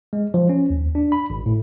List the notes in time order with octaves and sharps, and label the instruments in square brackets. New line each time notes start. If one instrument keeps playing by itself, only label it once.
[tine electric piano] G#3
F3
C#4
D#2
D4
B5
G#1
A2